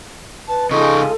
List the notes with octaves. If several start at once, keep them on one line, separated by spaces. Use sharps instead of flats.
B4 A5
C#3 G#3 D#4 F4 A4 D#5 C#6